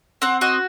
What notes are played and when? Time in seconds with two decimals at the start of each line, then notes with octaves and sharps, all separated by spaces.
0.22 C4 F#5
0.41 F#4 D#5